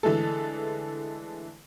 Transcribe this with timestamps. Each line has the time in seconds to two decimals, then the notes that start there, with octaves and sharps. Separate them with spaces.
0.03 D3 E3 G#3 A3 A4